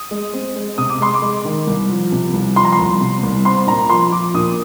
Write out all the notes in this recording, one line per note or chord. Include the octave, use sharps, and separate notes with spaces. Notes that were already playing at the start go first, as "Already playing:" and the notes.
Already playing: D#6
G#3
C4
G#3
C3 D#6
D6
G#3 C6
D6
G#3
D#3
C2
F3
C3
C2
F3 C6
A#5
C6
C2
C3
C2
C4 C6
A#2 A#5
F3 C6
F3 D6
A#2 D#6